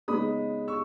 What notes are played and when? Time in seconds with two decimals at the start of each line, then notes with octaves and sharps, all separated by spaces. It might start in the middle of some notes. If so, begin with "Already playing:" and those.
0.08 C#3 G#3 B3 D#4 B5 D#6
0.68 C#6 E6